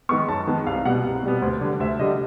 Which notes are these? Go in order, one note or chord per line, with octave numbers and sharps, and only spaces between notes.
D#3 G#3 B3 C#6
F#2 A5
D#3 G#3 B3
C2 F5
B2 G3 B3 F#5
C2
B2 G3 B3
D2
D3 G3
D2 E5
D3 G3 D#5